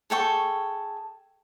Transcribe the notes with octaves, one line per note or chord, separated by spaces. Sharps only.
G#4 A4 G5 C#6